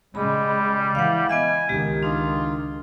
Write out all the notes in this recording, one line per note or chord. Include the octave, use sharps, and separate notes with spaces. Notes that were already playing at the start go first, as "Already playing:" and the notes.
C#3 G3 G#3 B5
E3 F5 F#5
B3 D#5 E5 G#5
C#2 D#3 G#3 G4
D4 D#4 F4